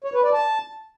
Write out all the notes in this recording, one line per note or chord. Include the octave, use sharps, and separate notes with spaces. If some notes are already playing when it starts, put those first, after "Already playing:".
C#5
B4
D5
A5